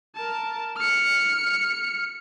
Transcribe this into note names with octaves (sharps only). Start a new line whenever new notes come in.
A#4 A5
F6 C#7